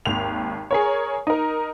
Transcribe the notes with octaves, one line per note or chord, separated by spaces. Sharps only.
G#1 D#2 F7
G#4 A#4 C#5
D#4 A#4